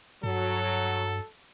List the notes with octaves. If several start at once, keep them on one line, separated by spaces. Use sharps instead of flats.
G2 F#3 A4